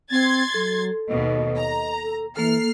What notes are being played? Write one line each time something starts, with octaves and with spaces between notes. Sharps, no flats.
C4 C6 G#6 A6
F#3 A4
D#2 B2 D#5
A#5
A4
E3 A#3 A4 F6 C7